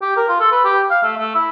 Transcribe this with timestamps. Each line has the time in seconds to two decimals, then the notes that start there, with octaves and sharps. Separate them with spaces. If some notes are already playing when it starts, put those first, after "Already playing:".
0.01 G4
0.17 A#4
0.28 F4
0.40 A4
0.52 B4
0.64 G4
0.90 F5
1.03 A3
1.17 A3
1.35 E4